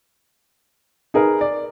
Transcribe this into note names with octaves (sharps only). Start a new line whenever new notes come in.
D#4 G#4 A#4 B4
D5